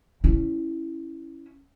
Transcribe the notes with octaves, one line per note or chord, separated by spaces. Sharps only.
C#4 E4